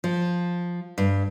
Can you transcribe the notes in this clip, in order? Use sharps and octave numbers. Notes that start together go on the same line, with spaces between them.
F3
G2